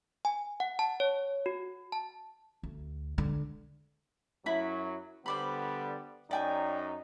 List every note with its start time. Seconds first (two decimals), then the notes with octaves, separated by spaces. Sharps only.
0.25 G#5
0.60 F#5
0.79 A5
1.00 C#5
1.46 F#4
1.92 A5
2.63 D2
3.18 D3 G#3
4.46 F#2 F#3 E4 B5
5.26 D3 G3 B3 C5 D5 B5
6.31 F#2 D#4 D5 G5 G#5